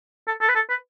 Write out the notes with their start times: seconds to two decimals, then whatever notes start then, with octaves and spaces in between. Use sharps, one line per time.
0.27 A4
0.41 A4
0.49 B4
0.55 A4
0.70 B4